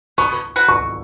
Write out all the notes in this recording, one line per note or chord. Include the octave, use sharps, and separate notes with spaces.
B3 C#6
F#4 B4
C#6